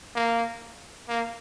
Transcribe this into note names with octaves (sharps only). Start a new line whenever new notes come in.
A#3
A#3